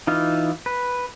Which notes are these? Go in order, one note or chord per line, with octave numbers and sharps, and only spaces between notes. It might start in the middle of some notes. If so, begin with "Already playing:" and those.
E3 D#4 F4
B4